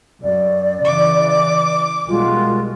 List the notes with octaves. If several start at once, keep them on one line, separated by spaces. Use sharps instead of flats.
F#2 D5
C#3 E3 D6
B1 G3 G#3 F4 F#4 A#4